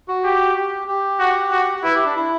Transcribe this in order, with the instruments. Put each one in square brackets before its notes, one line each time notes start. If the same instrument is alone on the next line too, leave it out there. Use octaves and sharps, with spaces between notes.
[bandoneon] F#4
[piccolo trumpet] G4
[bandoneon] G4
G4
[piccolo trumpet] F#4
F#4
[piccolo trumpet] E4 [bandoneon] B4
[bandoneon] G4
D4
E4